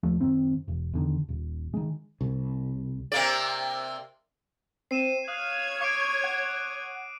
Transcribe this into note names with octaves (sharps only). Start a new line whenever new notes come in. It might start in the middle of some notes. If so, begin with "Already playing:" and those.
D#2 F3 A3
F#2 D#3 C4
E1
E2 D3 D#3
D#1
D#3 G#3
C2
C3 A#3 D5
C4 C7 D#7 E7
C#5 F5 D#6 F#6 G#6
C#6 D6 C7 D7
F#5